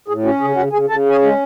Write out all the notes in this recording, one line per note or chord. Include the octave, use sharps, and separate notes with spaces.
A2 G#4
C#4 F#4
C#3 G#4
C#3 F#4 F#5
C#3 G#4 G#5
C#3 A4 A5
C#4 G#4 G#5
G#3